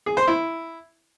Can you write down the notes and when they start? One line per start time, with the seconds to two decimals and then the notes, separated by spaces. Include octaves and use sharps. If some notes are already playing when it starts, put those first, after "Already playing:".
0.06 G#4
0.17 C5
0.27 E4